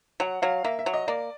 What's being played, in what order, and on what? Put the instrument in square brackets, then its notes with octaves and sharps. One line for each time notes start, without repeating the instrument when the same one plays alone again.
[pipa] F#3 [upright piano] F#5
[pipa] F#3 [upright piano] F5
[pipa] A#3 [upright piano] E5
[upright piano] E5
[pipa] F#3
[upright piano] D#5
[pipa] A#3 [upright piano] D5